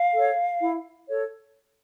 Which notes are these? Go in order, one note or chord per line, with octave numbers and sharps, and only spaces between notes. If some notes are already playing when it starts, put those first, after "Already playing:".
Already playing: F5
A4 C#5
E4
A4 C#5